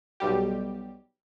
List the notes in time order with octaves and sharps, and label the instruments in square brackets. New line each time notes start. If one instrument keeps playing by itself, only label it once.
[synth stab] B1 G3 G4